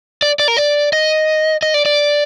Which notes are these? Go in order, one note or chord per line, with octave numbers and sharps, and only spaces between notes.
D5
D5
A#4
D5
D#5
D#5
D5
D5